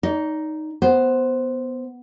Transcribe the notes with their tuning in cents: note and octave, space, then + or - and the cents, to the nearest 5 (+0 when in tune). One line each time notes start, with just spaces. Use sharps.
D#4 +0 D5 -40
B3 +5 C5 +0